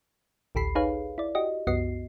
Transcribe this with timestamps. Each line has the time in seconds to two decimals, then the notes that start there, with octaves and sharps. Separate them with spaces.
0.55 A1 D2 G4 A4 B5 C7
0.75 D#4 G#4 B4 C#5 F5
1.18 E4 D5
1.35 F#4 G4 D#5
1.67 C2 F#2 B3 F#4 D#5 C7